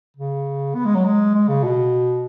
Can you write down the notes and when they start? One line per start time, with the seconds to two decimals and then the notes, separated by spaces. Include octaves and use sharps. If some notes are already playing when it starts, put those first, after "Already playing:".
0.17 C#3
0.75 B3
0.85 G#3
0.95 F#3
1.05 G#3
1.34 G#3
1.48 C#3
1.63 B2